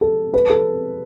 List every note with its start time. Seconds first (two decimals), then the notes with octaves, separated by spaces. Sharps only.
0.01 A4
0.34 B4
0.50 A4